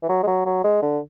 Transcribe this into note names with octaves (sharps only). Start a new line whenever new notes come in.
E3
F#3
G#3
F#3
F#3
G#3
D3